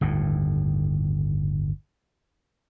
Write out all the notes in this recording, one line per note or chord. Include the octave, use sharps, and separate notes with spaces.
G1 D#2 A2